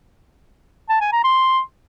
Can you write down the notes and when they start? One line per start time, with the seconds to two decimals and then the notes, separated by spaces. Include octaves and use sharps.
0.89 A5
1.01 G#5
1.13 A#5
1.24 C6